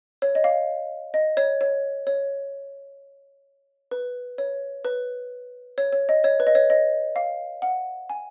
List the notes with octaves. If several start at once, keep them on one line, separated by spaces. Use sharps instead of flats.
C#5
D#5
F5
D#5
C#5
C#5
C#5
B4
C#5
B4
C#5
C#5
D#5
C#5
B4
D#5
C#5
D#5
F5
F#5
G#5